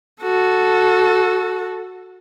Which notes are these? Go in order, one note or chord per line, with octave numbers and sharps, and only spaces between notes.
F#4 A4